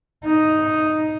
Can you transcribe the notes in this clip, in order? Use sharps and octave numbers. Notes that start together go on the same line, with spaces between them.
D#4